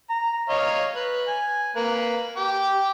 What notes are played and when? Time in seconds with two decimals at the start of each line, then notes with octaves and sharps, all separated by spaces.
0.10 A#5
0.49 C#5 D#5 F5
0.96 B4
1.28 G#5
1.76 A#3 B4
2.37 G5 D6